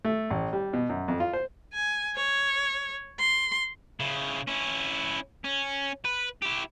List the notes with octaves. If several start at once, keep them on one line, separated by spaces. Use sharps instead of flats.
A3
A1
G3
B2
F#2
F2
F4
C5
G#5
C#5
C6
C#3 E4
C#4 E4
C#4
B4
E4 G4